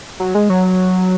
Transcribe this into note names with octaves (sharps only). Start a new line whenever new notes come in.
F#3
G#3
F#3